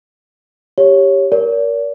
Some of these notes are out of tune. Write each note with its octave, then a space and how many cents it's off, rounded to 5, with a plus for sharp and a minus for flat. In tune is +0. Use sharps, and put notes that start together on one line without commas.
G4 +0 C#5 +0
A#4 +10 D5 -45